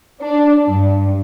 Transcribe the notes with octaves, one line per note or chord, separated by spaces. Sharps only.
D4
G2